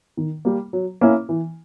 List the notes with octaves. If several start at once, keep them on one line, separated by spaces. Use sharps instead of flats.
D#3
G3 A#3
F#3
A#3 C#4 E4
E3